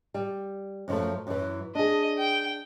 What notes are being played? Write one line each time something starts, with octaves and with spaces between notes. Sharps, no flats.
G3
F#2 F3 A3
F#2 E3
D4 G#4 D#5
G5